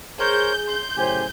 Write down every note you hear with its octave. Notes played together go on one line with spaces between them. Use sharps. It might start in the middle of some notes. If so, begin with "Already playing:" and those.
G#4 A#4 C5 C#5 G6
C6 G6
F#2 A2 C#3 G4 C5 G#5